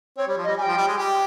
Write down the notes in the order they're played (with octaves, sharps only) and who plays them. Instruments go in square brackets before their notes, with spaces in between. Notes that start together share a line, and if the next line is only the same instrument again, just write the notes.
[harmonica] C4 [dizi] C#5
[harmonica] G3
F3
[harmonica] G3 [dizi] D#5
[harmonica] G3 [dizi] G#5
[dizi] G5
[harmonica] F3
G3
G#3
[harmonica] G4 [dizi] G#5
[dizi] G5